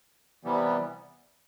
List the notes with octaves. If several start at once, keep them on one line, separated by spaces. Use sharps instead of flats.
C3 E3 G3 B3